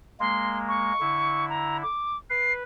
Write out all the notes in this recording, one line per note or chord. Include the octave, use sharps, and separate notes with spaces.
G#3 A#3 C6
C#6
D3 E4
A#5
D6
B4 C7